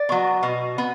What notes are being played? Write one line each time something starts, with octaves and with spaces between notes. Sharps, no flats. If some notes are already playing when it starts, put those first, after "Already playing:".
Already playing: D5
F#3 B3
B2
B3